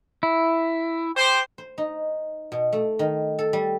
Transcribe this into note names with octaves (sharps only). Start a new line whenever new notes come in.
E4
G4 C5
C5
D#4
B2
A3
D#3
A4
G3